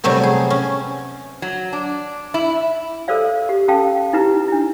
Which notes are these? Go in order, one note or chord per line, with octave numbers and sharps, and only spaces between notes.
C3 F#3 G3 A3 B3
G#4
C#4
F#3
D4
E4
A4 A#4 C5 D5 F5
G4
C#4 A4 F5 G5 A5
D#4 E4 G4 B4 A#5
D4 E4